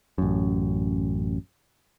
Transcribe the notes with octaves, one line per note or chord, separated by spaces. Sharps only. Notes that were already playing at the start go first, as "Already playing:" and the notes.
A1 F#2